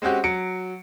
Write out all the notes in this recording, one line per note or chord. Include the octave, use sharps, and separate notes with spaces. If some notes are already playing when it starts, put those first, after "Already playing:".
G#3 C4 C#4 F#4 G4
F#3 C#7 D7